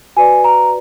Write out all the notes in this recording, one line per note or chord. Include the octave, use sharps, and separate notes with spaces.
F#4 B4 D5 G#5
A#5